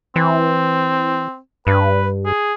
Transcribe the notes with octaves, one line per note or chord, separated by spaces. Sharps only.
E3 C4
G2 B4
G#4